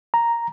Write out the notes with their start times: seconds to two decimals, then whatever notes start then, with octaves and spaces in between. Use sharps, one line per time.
0.14 A#5